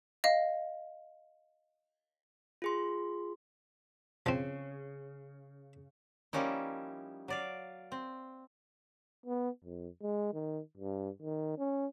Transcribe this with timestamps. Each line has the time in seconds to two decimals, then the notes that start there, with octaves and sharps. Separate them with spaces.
0.24 D#5 F5
2.62 F4 G#4 C6
4.26 C#3 F3 C4
6.33 F3 G3 A#3 C#4 D#4 E4
7.28 F#3 D5 F5
7.92 C4
9.26 B3
9.64 F2
10.02 G#3
10.34 D#3
10.77 G2
11.22 D#3
11.58 C#4